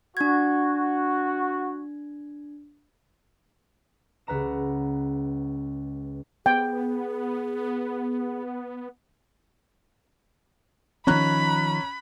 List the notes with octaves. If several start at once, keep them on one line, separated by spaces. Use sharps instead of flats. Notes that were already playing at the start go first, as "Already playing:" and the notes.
D4 F#4 G#6
C#2 B4 F#5 A#5 E7
B3 G#4 G5
D#3 F3 C#4 A#5 B5 F#6